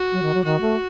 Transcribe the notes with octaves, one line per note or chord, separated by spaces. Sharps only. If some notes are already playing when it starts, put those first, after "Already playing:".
Already playing: F#4
F#3
D#3
F#3
D#3 F#4
A3